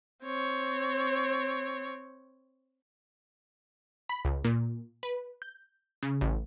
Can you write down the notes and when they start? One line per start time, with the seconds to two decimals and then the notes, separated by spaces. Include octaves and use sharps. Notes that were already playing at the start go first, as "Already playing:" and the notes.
0.23 C4 C#5
4.09 B5
4.25 C#2
4.44 A#2
5.03 B4
5.42 G6
6.03 C#3
6.21 A1